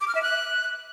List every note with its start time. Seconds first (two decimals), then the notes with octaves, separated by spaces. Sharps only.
0.01 D6
0.08 F6
0.15 E5
0.22 F#6